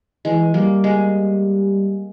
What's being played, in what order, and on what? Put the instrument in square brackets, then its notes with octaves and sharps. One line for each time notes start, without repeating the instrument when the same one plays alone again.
[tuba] E3 [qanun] G#3
[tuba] G3 [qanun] A#3
[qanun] G#3